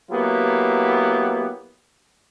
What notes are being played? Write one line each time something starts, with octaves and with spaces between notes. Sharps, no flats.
F#3 A#3 B3 E4 G4